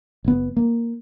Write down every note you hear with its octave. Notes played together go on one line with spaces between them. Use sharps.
F#1 B3
A#3